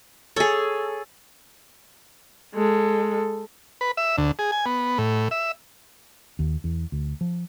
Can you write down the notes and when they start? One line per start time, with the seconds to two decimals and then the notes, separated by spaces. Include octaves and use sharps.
0.36 G#4 A4 C#5
2.54 G#3 A4
3.81 B4
3.97 E5
4.18 D2
4.39 G#4
4.52 G#5
4.66 B3
4.98 A2
5.31 E5
6.39 D#2
6.64 E2
6.92 D2
7.21 F3